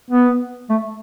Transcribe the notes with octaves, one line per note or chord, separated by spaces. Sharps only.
B3
A3